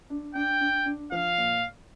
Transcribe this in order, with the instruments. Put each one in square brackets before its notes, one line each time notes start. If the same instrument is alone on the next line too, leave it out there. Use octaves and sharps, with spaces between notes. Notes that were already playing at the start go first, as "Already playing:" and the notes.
[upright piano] D4
[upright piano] D4 [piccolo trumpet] G5
[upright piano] D4
D4
[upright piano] F3 [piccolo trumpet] F5
[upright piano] A#2